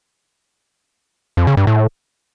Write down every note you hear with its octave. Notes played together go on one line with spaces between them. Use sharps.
F2
C#3
G2
A2